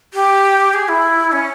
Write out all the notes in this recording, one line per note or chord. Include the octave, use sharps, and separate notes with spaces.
G4
G#4
E4
C#4